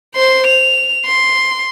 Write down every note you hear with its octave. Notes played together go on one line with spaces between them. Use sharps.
C5 C6
F7
C6